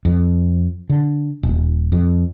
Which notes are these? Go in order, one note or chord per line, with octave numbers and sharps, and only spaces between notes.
F2
D3
D#1
F2